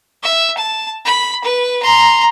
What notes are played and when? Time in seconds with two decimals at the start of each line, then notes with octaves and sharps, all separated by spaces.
0.23 E5
0.57 A5
1.05 B5
1.44 B4
1.82 A#5 C6